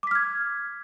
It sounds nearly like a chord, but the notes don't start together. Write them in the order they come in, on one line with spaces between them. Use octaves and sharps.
D6 B6 F6 G#6